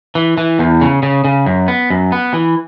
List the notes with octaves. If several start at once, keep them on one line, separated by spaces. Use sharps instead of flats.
E3
E3
E2
C#3
C#3
C#3
F#2
B3
F#2
B3
E3